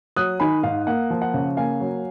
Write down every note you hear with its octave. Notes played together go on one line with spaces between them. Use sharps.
F#3 D#6 F#6
D#3 G#5 B5
G#2 F5
A#3 F#5
F3
F#5
C#3
A#3 F5 G#5
F#3